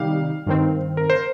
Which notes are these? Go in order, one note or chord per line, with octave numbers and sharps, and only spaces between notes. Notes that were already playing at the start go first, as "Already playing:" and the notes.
Already playing: C3 D#3 G3 D#4 G4 F5
G2 D#3 C4
A#4
C5